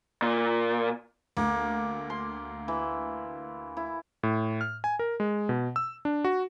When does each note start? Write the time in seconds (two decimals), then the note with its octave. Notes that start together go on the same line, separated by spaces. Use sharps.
0.22 A#2
1.37 D2 A#3
2.10 C6
2.68 E3
3.77 E4
4.23 A2
4.61 F6
4.84 G#5
4.99 A#4
5.20 G#3
5.49 B2
5.76 E6
6.05 D4
6.25 F#4